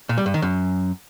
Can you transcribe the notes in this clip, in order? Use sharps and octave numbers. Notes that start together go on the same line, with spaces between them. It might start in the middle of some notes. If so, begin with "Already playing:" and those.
A#2
G3
G2
D#3
F#2